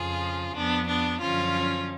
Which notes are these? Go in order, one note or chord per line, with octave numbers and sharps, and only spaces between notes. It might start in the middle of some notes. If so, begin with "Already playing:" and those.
Already playing: F2 C#3 F3 F4 G#4
F2 F3 B3 D4
B3 D4
F#2 D3 F3 C#4 F4